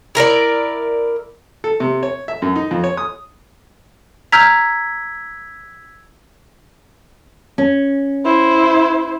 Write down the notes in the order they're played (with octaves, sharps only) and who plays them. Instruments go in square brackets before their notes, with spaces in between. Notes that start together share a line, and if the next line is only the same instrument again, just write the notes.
[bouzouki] E4 A#4 B4 D5
[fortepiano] A4
C3
C#5
E5
F#2
D#4
F2
C#5
D#6
[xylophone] A#5 F6 G6 [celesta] E6 G#6 B6
[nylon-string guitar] C#4
[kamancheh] E4 C5